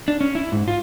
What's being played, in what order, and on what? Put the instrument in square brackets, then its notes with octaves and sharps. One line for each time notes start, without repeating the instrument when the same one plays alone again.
[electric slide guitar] D4
C#4
E4
G#2
F4